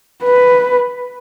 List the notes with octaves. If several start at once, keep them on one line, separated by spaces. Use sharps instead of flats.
B4